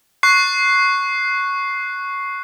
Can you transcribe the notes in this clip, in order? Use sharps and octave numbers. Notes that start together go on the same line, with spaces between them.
C#6 F#6 C7